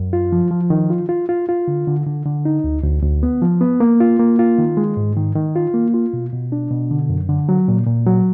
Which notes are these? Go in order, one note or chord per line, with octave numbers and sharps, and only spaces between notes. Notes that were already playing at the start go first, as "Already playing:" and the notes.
Already playing: F#2
F4
F3
F3
D#3
F4
F4
F4
F4
D3
D3
D3
D3
D#4
D2
D2
D2
B3
F3
B3
A#3
F4
A#3
F4
D#3
G#3
G#2
D#3
D#3
F4
A#3
F4
B2
B2
D4
B2
D3
F#2
D3
F#3
A#2
A#2
F#3